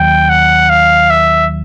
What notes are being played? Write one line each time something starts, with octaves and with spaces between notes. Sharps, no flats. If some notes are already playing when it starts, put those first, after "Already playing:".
Already playing: D#2 D#3 F#3 G5
F#5
F5
E5